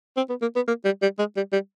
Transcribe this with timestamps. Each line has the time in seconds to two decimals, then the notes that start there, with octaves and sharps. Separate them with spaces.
0.17 C4
0.29 B3
0.42 A#3
0.56 B3
0.68 A#3
0.85 G3
1.02 G3
1.19 G#3
1.37 G3
1.53 G3